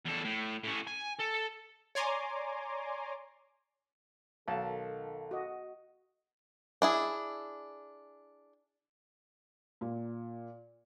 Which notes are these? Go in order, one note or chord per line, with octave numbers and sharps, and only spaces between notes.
E2 A4
A2
A2 C#4
G#5
A4
C#5 D5 G#5 A#5 C6 D6
B1 D#3 A4 A#4 F5 A5
F#4 D#5
D4 E4 G#4
A#2